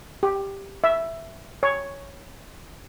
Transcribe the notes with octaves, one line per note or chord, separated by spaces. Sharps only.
G4
E5
C#5